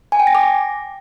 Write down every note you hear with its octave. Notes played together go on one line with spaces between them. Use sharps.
G#5
G5
A#6
D6